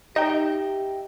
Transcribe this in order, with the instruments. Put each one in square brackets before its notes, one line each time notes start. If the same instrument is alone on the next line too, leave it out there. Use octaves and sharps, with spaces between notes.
[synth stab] D#4 [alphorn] G4 [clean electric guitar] D#5 E5 G5